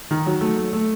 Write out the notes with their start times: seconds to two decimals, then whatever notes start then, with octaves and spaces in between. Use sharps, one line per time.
0.11 D#3
0.26 F#3
0.41 A3
0.57 A3
0.73 A3